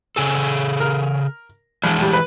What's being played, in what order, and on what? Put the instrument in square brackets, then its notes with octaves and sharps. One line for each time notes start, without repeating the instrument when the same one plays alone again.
[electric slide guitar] C#3 G#4 A4
[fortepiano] A#4
[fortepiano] A#1 [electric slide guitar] E3 G#3
[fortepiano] A2 G3
B4